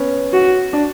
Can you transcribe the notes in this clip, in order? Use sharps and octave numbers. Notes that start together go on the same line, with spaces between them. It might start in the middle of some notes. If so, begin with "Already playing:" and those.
Already playing: B3 C#4
F#4
D4